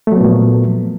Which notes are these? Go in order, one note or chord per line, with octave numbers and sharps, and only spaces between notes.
A#2 F3 F#3 A3 B3